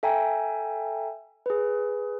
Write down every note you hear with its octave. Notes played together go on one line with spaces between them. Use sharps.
A4 E5 G5 G#5 A#5
G#4 B4